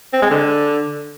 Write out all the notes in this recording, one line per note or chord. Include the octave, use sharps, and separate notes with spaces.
C4
G#3
D3